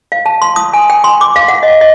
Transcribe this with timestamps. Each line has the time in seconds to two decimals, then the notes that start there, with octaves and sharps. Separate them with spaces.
0.12 F5
0.26 A5
0.42 C6
0.56 D#6
0.73 G#5
0.90 G5
1.04 C6
1.21 D6
1.36 F5
1.48 F#5
1.63 D#5
1.81 D#5